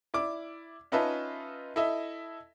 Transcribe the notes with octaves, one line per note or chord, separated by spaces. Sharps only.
E4 D5 D6
C#4 D#4 F4 B4 E5 A5
E4 A4 D#5 E5